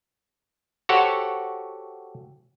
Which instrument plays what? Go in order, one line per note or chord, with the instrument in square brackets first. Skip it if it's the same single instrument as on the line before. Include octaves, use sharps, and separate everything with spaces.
[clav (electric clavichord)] F#4 G4 A4 C5 C#5 F#5